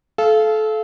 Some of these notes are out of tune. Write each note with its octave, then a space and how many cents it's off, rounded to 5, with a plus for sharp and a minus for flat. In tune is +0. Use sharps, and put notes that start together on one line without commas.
A4 -25 F5 -25